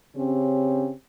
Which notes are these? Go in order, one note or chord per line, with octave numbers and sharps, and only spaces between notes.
C#3 C4 C#4 G4